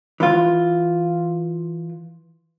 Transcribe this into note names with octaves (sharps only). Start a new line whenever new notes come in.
E3 F4